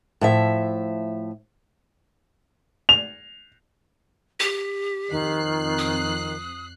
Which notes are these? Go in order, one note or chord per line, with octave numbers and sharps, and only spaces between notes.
A2 F3 E5
F7
G4
F2 D#3 F#6 C7
D#6